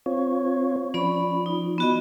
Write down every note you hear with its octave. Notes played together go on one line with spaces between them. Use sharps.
C4 F4 C#5
F3 C#4 D5 B5
D#4
B3 F#4 D#5